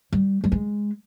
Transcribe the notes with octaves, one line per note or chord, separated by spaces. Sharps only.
G3
G3
G#3